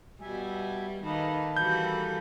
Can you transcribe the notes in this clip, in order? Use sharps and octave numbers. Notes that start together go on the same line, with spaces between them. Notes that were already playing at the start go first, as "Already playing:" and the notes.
B2 G3 E5 G#5
D#3 A#3 A4 B4
E3 G3 F#4 G6